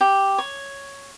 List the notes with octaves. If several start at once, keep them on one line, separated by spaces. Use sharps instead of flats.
G4
C#5